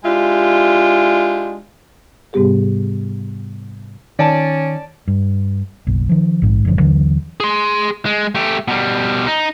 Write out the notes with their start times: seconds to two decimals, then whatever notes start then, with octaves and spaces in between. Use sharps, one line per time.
0.04 G#3 D4 E4 F4 G4
2.33 G#2 C3 G3 B3 G4 G#4
4.19 D#3 C#4 D5 A5
5.08 G2
5.87 F#1 B1
6.09 D#3 F3
6.42 A#1 G#2
6.65 F#1 A#2 D3 F3
6.77 D#2 D3 E3 F#3
7.40 G#4 C6
8.06 G#3
8.35 A3 G4
8.68 B2 G3
9.27 D#4